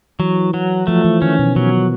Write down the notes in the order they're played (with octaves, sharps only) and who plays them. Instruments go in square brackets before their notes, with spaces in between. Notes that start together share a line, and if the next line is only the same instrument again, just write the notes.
[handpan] E3 [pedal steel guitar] F#3
[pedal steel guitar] F#3
[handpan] F3 [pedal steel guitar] A3
[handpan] E3
[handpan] D#3 [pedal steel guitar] C#4
[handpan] B2
[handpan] B2 [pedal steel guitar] F#3